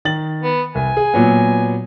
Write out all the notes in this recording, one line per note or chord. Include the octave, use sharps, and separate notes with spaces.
D#3 A6 F#7
B3
C2 G#5
G#4
A#2 F#3 B3